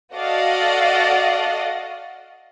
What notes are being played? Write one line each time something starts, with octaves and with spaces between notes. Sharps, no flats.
F#4 A4 D5 D#5 F5 F#5